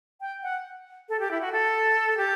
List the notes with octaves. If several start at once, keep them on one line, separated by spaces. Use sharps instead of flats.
G5
F#5
A4
G4
E4
F#4
A4
G4